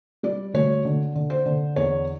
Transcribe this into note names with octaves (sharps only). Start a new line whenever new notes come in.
G3 D5
D2 C#5
D3
D3
C5
D3
E2 C#5